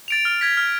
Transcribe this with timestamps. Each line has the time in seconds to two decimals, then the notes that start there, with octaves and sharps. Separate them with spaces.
0.08 A6 D7 F7
0.25 F6
0.41 G#6 B6
0.57 F6